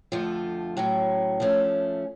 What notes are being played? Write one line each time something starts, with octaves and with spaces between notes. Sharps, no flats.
F2 D3 F3 A3 F4
A2 F#3 C#4
F3 A3 C#4